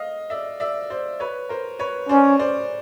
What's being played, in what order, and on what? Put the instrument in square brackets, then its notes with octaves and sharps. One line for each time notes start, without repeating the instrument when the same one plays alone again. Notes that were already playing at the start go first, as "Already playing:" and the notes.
Already playing: [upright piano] D#5 F5
D5 E5
D5 E5
C5 D5
B4 C#5
A#4 C5
B4 C#5
[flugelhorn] C#4 [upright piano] C5 D5
[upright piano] C5 D5